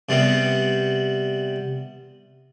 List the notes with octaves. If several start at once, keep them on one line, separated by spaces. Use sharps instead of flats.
C3 G3 B3